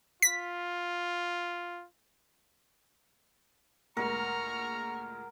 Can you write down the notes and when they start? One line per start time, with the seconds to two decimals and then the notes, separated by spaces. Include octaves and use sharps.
0.22 F4 B6
3.97 D2 A#2 G#3 A#4 A#5 C#6 F6